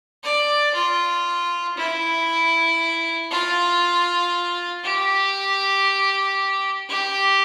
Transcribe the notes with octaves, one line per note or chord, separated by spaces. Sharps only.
D5
F4
E4
F4
G4
G4